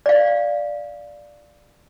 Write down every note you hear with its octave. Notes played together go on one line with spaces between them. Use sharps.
D5 F5